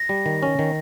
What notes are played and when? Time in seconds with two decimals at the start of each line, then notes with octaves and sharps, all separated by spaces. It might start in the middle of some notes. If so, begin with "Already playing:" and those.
Already playing: A#6
0.09 G3
0.26 D#3
0.43 C#4
0.59 D#3